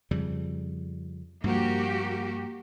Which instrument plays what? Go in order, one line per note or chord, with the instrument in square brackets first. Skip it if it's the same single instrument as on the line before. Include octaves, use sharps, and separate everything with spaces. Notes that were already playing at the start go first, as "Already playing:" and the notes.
[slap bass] F2 C#3 G3
[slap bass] G2 F3 [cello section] A#3 F#4 G4